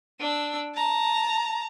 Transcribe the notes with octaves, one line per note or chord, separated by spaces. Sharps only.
D4 E6
A5 A#5